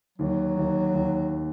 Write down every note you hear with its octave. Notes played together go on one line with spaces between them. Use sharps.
D#2 F#3
D#2
D#2